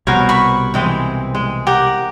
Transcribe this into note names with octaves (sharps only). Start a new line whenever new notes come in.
C2 B2 B3 A#4 C5 C#5
B5 C#6
E3 G#3 C4
G#3
G4 A#4 F#5